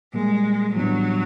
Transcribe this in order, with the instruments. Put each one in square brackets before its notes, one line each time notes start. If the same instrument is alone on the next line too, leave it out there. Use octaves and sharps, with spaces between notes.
[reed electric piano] A#2 G3 A#3 [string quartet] G#3
[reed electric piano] A2 E3 G3 B3 D4 [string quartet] F#3